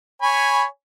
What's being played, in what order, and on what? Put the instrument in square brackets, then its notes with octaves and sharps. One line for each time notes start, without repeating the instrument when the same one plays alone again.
[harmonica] C#5 G#5 B5